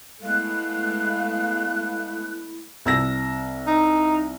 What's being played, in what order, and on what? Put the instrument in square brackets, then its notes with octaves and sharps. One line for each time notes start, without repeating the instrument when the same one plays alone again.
[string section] G#3 A3 B3 [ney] E4 [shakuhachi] F5 [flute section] F#6
[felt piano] C2 E6 A#6
[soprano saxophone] D#4